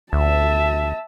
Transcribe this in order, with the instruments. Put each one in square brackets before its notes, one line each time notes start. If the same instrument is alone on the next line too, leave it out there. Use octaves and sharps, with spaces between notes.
[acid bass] D2 [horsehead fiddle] E5 A5